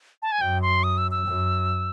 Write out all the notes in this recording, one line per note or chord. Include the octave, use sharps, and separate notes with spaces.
A5
G#5
F#2 G5
C6
D#6
E6
E6
F#2